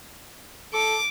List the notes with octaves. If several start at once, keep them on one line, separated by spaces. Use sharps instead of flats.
A4 D6